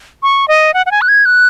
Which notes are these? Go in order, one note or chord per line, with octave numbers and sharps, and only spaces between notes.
C#6
D#5
F#5
F#5
G#5
F#6
G#6
F#6